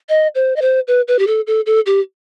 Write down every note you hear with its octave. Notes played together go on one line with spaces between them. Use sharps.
D#5
C5
D#5
C5
B4
B4
G4
A4
A4
A4
G4